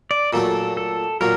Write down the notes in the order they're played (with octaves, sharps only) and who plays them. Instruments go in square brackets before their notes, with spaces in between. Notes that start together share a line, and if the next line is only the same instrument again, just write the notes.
[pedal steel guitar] D5
[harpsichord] A#2 F#3 A3 [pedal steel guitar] A4
[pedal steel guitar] A4
[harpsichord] A#2 F#3 [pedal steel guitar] A#4